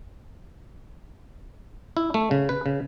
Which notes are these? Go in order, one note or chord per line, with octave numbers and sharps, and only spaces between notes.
E4
A3
C#3
B4
C#3